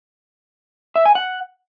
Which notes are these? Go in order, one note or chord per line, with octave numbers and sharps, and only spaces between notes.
E5
G#5
F#5